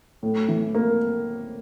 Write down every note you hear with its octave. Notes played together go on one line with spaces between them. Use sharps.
A2
E3
A#3